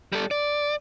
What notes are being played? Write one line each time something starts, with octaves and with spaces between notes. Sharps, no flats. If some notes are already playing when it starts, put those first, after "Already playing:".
G3 A4
D5